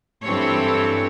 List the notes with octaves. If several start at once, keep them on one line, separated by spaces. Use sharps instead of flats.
G2 E3 C4 A4 C#5